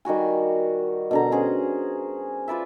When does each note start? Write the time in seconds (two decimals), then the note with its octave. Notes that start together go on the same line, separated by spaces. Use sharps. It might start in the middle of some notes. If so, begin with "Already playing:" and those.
0.05 D#3 G3 F#4 G#5
1.11 B2 D3 A#5
1.32 C#4 G#4 C5 A#5
2.48 F4 B4 D5 E5